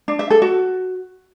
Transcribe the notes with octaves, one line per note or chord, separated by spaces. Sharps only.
D4
E5
A4
F#4